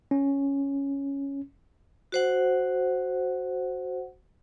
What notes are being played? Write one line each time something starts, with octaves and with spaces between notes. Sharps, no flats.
C#4
F#4 C5 F#5